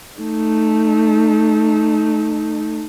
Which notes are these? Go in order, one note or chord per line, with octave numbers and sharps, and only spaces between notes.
A3 D#4